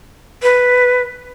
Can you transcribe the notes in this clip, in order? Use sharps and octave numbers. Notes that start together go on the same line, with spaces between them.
B4